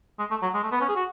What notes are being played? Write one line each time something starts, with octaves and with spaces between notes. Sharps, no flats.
G#3
A3
F#3
G#3
A3
B3
C#4
G#4
F#4